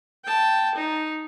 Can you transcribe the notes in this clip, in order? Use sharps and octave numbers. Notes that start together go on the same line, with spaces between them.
G5 A5
D#4